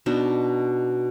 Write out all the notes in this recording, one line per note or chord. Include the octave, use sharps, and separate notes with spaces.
B2 D4 D#4